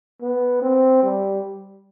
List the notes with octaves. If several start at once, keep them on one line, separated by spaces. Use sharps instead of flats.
B3
C4
G3